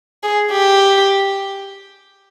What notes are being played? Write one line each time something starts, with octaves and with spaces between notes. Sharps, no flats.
G#4
G4